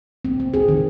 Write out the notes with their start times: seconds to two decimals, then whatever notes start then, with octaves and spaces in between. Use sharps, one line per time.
0.25 C4
0.40 C4
0.54 G#4
0.68 D#3